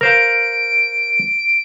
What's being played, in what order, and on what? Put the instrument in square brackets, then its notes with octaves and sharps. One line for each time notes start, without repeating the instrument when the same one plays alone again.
[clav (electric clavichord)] A#4 C5 F5 [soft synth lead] D7